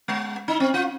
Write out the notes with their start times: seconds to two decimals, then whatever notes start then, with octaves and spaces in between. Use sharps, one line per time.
0.08 G#3
0.48 D#4
0.60 C4
0.74 F4